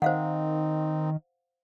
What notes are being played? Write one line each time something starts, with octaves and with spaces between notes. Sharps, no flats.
D#3 C4 D#4 C5 F5 F#5